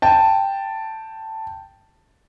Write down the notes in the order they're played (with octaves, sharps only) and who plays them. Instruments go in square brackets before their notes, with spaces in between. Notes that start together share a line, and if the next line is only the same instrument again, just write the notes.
[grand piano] G5 A5